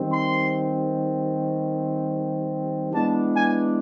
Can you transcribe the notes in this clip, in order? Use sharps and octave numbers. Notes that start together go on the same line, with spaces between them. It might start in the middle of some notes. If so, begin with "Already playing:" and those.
Already playing: D#3 G3 C4
C6
E3 G#3 B3 D4 A5
G#5